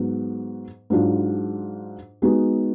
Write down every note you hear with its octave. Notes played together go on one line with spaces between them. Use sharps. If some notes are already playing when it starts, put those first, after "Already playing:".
Already playing: G#2 F#3 B3
G#2 F#3 D4 F4
G#3 B3 D#4 F#4